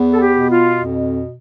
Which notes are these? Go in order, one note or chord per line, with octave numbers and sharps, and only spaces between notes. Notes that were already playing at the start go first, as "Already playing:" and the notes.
Already playing: E2 B3
A4
G4
B2
F4
F2